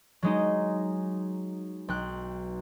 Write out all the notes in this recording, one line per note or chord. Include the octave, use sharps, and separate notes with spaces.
F#3 G#3 D#4
B1 G5 F#6